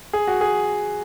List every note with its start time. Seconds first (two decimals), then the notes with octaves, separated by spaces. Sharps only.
0.13 G#4
0.27 F#4
0.41 G#4